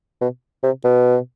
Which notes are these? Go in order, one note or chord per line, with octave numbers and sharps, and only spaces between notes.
B2
C3
B2